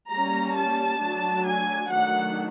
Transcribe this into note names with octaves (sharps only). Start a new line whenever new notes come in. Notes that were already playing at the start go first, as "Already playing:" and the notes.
G3 A#3 C#4 A#5
A5
F#3 A3 D4
G#5
D#3 F#3 A3 D4 F#5